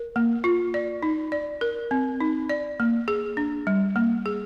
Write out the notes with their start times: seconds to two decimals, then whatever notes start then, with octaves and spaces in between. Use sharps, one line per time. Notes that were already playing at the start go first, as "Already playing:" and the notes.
Already playing: A#4
0.16 A#3
0.44 F4
0.74 D5
1.03 D#4
1.32 D5
1.61 A#4
1.91 C4
2.21 D#4
2.49 D5
2.80 A#3
3.08 G#4
3.37 D4
3.67 G3
3.96 A#3
4.26 G#4